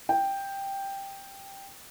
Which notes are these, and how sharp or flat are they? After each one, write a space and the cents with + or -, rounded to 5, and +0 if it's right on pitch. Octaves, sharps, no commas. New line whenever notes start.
G5 +5